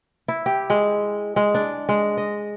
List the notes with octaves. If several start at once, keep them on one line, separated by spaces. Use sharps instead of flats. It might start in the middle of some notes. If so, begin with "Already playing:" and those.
E4
G4
G#3
G#3
D4
G#3
D#5